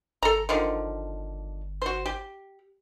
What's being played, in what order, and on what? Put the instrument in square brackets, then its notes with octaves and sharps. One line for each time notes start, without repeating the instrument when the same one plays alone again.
[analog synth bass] G1 [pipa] A4 A#5
[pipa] D3 D#3 F3
F#4 C5
G4